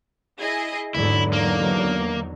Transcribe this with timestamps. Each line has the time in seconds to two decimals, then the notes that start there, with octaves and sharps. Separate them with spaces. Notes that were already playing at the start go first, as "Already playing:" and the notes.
0.41 E4 G#4 D#5
0.95 E2 G#2 D3 F#3 E4
1.33 A#3 D#4